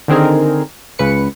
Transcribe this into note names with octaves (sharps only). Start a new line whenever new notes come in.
D3 D#3 C4 G#4 A#4
C#2 C#3 B4 C#7